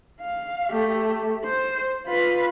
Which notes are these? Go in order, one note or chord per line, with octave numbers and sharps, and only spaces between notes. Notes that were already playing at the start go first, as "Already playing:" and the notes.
F5
A3 G4
C5
F4 B4